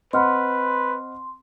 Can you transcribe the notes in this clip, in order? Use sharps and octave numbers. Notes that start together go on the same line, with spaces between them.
C4 B4 D#5 F#5 B5 C6 F6